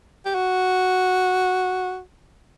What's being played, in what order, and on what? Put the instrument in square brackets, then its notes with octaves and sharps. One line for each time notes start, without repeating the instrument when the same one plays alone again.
[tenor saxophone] G4
F#4